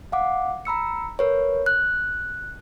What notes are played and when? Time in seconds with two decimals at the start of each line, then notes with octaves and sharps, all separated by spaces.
0.12 F5 F#5 D6
0.65 A#5 B5 E6 C#7
1.19 A#4 B4 C#5
1.66 F#6